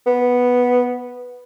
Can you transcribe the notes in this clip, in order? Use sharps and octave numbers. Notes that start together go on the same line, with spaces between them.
B3